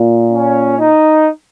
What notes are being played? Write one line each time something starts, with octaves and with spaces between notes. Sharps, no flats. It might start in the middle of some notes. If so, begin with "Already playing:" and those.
Already playing: A#2
C#4
D#4